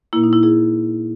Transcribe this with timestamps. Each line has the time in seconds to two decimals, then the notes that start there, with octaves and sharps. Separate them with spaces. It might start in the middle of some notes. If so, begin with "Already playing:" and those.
0.13 A#2 A#3 E4
0.23 D#4
0.33 E4
0.43 E4 G#4